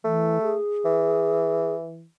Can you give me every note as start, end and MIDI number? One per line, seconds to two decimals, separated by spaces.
0.04 0.38 52
0.04 0.55 57
0.42 1.74 68
0.85 2.06 52